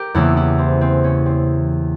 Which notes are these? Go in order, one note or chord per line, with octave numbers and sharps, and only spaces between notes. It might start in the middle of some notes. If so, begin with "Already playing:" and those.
Already playing: G4 A#4
E2 C#3 E3 A#3 E4
E4
C4
C4
C#4
C4